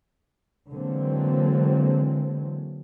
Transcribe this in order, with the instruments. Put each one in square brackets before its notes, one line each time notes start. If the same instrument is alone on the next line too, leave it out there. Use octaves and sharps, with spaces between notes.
[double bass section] D3 E3 F#3 G#3 A#3 C4